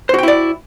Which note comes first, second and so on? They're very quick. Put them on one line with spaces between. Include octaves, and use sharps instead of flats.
C5 F#4 G5 E4 D5